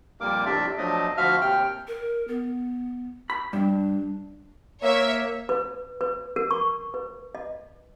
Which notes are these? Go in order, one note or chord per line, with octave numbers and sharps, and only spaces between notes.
F2 A#2 G3 A#3 A#4 D6
F2 A2 C3 D4 D5 E5
F3 F#3 A3 D4 D#5
D2 F3 F#4 E5 F5 F6
D#2 C3 G5 F6
A#4
B3
B5
G2 D4
A#3 C#5 E5
B4
B4
A#4
C#6
B4
D#5